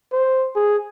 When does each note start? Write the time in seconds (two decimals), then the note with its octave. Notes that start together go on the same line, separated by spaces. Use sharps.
0.13 C5
0.56 G#4